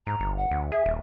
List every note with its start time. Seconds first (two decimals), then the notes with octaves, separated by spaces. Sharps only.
0.07 G#2 A#5
0.20 G1
0.38 F#5
0.51 D2
0.72 G#4 E5
0.86 D#1